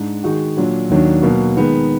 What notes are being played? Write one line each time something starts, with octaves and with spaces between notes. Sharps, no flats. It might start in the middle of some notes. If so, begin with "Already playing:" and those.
Already playing: G#2 D4
D#3 G#3 D#4 F#4
A#2 F#3 D4
D#2 D#3 F#3 D4
B2 F#3 A#3
D#3 G#3 B3